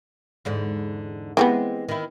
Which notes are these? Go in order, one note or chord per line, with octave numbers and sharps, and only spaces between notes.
E2 G#2 D3
E3 F3 G#3 B3 C4 G4
D#3 E4